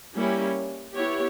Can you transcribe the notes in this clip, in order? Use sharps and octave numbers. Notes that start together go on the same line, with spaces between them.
G3 A#3 C#4 E4 G4
B3 E4 G4 C#5